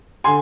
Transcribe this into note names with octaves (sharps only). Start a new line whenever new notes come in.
D3 G#5 C6